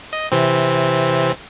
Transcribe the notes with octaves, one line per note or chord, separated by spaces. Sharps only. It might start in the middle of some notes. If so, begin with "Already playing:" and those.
D#5
C3 E3 C4